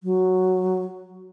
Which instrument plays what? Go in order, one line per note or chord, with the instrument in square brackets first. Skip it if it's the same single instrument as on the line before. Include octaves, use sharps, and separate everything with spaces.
[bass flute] F#3